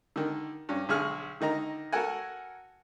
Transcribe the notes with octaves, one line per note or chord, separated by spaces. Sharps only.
D3 D#3
G2 C#4
B1 D3 G#4 C#6 F6
D3 D#3 D#5 A#5
F#4 A4 A#4 F#5 G#5